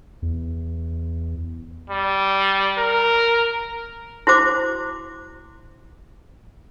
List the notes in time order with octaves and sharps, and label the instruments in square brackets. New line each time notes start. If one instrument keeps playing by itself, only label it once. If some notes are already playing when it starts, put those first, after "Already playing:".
[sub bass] E2
[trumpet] G3
A#4
[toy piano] E4 F#4 C5 D6